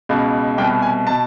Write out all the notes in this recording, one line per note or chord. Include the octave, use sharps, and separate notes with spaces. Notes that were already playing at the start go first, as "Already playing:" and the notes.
C#2 B2
C2 B2 G5
G#5
B2 A5